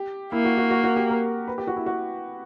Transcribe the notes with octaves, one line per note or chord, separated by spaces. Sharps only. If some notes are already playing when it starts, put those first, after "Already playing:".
Already playing: G4
A#3 E4
F#4
F#4
F#4
F#4
G4
A#4
B4
G4
F#4
E4
F#4